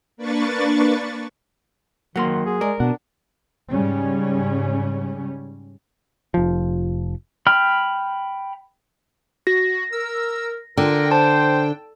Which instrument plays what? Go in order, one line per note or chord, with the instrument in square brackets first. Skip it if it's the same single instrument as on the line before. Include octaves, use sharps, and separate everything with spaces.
[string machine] A#3 D4 B4 C#6 A6
[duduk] D#3 [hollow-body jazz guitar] F#3 A#3 [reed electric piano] F#5 C6
[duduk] G#4
[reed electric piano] G#3 D5 [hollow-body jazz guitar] A#4
[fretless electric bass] B2 [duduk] D4 [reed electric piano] F#5
[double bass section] G#2 C#3 G3 C#4
[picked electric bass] F1 F3
[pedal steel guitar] G5 B5 F6
[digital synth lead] F#4 [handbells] A#6
[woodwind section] A#4 [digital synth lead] E6
[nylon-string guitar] D3 [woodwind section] F4 A#4 [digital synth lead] G5
[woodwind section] C5 [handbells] A5